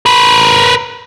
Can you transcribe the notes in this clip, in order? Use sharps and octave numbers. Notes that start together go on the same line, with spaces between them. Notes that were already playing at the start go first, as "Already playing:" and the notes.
A#4 B4